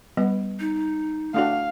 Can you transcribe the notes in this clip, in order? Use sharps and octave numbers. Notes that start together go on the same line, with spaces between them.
G3 B3
D#4
A3 D4 F#4 F5